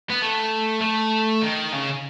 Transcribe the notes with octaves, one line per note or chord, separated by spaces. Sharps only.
B3
A3
A3
D#3
C#3